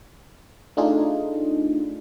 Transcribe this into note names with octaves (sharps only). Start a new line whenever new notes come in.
A3 D4 D#4 F4 G#4